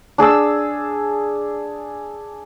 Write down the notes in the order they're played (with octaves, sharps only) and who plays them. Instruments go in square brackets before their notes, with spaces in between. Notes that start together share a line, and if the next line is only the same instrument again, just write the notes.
[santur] D4 G#4 D5 E6